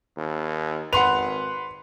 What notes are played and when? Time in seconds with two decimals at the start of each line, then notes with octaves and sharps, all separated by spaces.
0.17 D#2
0.93 G#1 B4 F#5 C6 F7